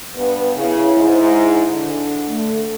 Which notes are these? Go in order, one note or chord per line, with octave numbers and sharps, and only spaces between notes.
G2 B3 B4
C#3 E4
G#2
D3
A3